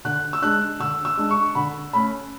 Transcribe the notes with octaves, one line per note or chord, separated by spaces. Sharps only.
D3 F#6
E6
G#3 D4 F#6
D3 E6
E6
G#3 D4
C#6
D3 B5
A3 C#4 B5